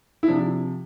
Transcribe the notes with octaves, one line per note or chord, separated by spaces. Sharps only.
E4
C3 F3 D4